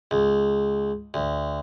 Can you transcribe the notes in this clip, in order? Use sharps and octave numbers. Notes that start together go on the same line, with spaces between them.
C#2
D2